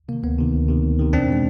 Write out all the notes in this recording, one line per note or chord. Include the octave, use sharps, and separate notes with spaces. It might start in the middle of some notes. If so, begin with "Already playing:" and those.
C3 D#3 A#3
D2 B3
C3 D#3
D2
C3 D#3
D2
C3 D#3
E2 C4 D4
B2 G#3